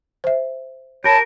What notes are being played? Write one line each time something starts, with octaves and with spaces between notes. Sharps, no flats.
C5 E5
G4 A#4 C#5 A5 B5